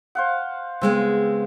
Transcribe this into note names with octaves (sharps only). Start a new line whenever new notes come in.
C5 F5 F#5
C#3 G#3 B3 C4